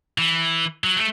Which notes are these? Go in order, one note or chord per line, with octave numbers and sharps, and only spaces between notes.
E3
F#3
A3